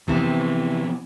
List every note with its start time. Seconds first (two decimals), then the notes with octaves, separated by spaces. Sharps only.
0.08 C3 E3 F3 B3 C4